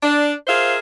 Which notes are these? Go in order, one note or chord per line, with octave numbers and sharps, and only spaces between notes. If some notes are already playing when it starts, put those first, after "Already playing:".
D4
F4 G#4 A#4 C5 E5 F5